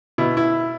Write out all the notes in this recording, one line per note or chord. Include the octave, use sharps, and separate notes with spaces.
B2 E4
E4